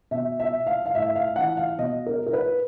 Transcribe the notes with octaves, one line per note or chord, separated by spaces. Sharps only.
B2 E5
E5
F5
F5
A2 E5
F5
E3 F#5
F5
B2 D#5
A#4
A#4
B4